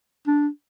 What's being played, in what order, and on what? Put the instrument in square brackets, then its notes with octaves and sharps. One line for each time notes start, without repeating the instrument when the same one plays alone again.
[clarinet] D4